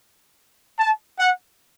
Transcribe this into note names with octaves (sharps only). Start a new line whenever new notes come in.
A5
F#5